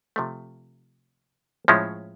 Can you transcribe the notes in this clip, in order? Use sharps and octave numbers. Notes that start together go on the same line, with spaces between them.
C3 F3 A3
A2 F3 G#3 C#4 E4